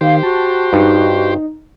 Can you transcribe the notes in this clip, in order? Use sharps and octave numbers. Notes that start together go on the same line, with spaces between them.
D#3 G4 C5 F5
F#4 A5
G2 D#4